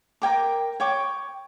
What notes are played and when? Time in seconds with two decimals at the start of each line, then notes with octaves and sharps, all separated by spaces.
0.22 A#4 C#5 G5 D6
0.80 C#5 G5 D6